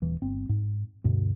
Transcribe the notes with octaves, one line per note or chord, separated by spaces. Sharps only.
D#1 E3
G1 C4
G#2
D2 G2 B2